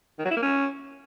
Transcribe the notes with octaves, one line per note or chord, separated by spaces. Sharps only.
D#3
F#3
E4
A#3
C#4